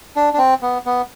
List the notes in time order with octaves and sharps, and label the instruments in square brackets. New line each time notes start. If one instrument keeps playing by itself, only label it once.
[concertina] D4
D4
C4
B3
B3